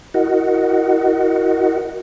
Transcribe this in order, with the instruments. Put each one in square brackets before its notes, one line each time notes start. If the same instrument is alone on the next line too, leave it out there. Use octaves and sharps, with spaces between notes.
[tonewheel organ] E4 F#4 A#4 D#5 F#5